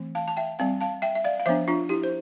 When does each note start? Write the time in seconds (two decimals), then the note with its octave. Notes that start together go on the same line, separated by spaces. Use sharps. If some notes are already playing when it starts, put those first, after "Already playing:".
Already playing: E3 A3 C4
0.15 F5 A5
0.28 A5
0.37 E5 G5
0.59 G3 C4 F5 A5
0.81 F5 A5
1.02 E5 G5
1.15 E5
1.24 D5 F5
1.40 F5
1.46 F3 B3 D4 C5 E5
1.68 D4 F4
1.89 E4 G4
2.03 C5